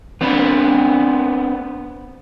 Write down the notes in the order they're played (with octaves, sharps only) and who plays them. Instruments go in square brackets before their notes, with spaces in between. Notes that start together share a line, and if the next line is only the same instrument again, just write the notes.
[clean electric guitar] B3 C4 D4 B4